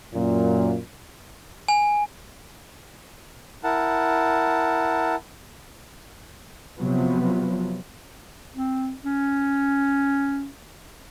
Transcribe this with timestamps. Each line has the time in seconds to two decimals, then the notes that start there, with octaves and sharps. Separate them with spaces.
0.14 F#2 A#2
1.68 G#5
3.64 E4 A#4 F#5 A5
6.79 C3 F3 F#3 B3
8.54 C4
9.04 C#4